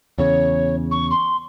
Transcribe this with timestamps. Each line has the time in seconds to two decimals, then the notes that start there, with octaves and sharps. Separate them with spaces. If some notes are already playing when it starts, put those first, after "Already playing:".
0.18 E2 C#3 C#5
0.91 C#6
1.11 C6